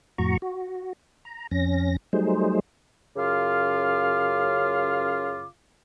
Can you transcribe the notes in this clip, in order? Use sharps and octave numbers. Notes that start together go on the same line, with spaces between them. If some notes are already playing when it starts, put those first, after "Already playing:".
F2 A2 F#4 A#5 C#6
F#4
A#5
F2 C#4 A#6
F#3 G3 A3 D#4 G#4 C5
F#2 C#3 F4 F5 D6